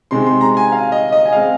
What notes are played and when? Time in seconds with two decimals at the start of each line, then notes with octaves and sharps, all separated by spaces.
0.11 C3 G#3 C4 D#4 C6
0.27 C6
0.41 A#5
0.57 G#5
0.72 F5
0.92 D#5
1.12 D#5
1.25 G#5
1.32 G#3 C4 F5